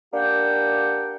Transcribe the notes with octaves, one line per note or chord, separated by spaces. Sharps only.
A#3 D4 G4 F#5 G5